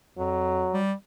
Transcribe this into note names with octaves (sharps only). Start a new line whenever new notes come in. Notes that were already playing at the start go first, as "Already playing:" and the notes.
F2 F#3
G3